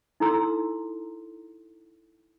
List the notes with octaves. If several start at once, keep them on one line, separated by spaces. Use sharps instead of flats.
D#4 E4 A4 A#5 C6 E6